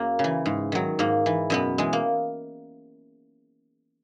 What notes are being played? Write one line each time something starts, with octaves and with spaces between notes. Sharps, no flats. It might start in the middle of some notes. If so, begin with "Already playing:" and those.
Already playing: F#2 F#3 A#3 G#4
C#3
E3
G#2
D#3 F#3
G#2 A#3
E3
F#2 B2 B3
E3 G#3
A#3